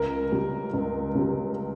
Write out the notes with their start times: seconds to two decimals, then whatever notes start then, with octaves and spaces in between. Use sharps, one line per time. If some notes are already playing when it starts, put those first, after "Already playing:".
Already playing: C#2 A#4
0.32 C#3 G3
0.74 C#2
1.15 C#3 G3